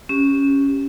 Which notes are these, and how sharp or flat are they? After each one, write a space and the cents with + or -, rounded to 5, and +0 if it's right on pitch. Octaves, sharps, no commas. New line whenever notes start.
C#4 +0 G4 +0